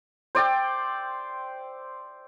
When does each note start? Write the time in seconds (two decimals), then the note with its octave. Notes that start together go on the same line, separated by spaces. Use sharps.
0.35 C5 D5 E5 G5